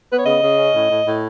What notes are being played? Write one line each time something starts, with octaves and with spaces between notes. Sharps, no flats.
B3 B4
C#5
C#3 D#5
C#3
C#4
A2
A2
A2